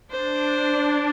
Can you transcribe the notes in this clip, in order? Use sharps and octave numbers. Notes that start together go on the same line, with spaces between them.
D4 C5